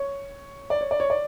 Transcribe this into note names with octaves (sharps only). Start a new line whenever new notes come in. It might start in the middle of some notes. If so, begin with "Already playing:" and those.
Already playing: C#5
D5
C#5
D5
C#5
D5